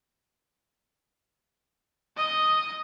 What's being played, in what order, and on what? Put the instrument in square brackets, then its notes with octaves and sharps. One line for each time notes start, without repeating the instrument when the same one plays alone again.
[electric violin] D#5 D#6